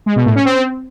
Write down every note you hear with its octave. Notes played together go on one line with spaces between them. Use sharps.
G#3
B2
A2
C#4
C4